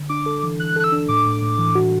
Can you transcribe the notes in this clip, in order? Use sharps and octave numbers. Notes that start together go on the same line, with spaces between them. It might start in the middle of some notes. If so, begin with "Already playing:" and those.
Already playing: D3
D4 D6
A4
E3
E3 F#6
A4 F#6
E6
D4
A2 D6
A2
A2
E3
F#4